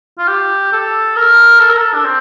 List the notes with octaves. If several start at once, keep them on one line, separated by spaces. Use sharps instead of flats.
F4
G4
A4
A#4
A4
A#4
A4
D4
C4